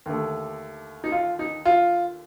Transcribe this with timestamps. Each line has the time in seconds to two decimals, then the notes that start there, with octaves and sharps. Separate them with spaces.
0.06 D#2 D3 A3
1.04 D#4
1.12 F4
1.39 D#4
1.65 F4